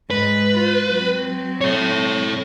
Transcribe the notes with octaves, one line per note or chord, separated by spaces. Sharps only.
G#2 B4
F4
F#3 C4
A4 C#5